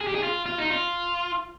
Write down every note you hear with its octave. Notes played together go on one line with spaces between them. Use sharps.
G#4
G4
G#4
F4
F4
D#4
F4